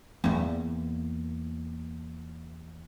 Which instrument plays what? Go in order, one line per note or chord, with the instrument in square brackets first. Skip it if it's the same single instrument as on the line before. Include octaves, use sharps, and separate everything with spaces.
[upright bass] E2 A#3